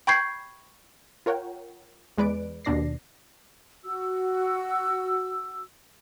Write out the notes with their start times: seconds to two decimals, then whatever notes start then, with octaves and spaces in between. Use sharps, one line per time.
0.07 G5 B5 C#6 G6 G#6 C7
1.26 F4 A#4 C#5 F#5 G5
2.18 E2 G#3 B4 D5 D7
2.65 D#2 B2 D4 D5 A#6 C7
3.84 F#4 E6